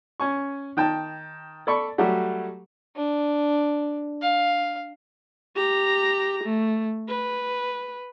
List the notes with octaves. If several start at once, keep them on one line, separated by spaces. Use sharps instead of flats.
C#4 G#5 C#6
D#3 G5 A5
A4 D5 B5 C#6
F#3 G3 A3 F#4 G4
D4
F5
G4 A#5
A3
B4